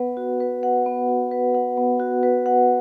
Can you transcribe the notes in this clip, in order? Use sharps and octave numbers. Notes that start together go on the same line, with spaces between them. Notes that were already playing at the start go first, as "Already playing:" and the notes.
Already playing: B3 B4 F#5
F#4
B4
F#5
B3
F#4
B4
F#5
B3
F#4
B4
F#5